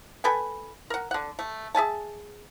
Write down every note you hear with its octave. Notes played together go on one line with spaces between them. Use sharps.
A4 B4 G5 G#5
A#4 F#5
D3 F#5
A3
G#4 E5 G#5 A5